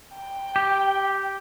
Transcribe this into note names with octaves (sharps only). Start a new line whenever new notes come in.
G5
G4